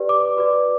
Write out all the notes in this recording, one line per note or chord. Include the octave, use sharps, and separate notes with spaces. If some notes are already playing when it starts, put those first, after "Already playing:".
Already playing: G4 B4 D5
D6
F#4 B4 D5